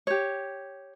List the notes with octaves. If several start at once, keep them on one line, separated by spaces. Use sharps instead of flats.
G4 C#5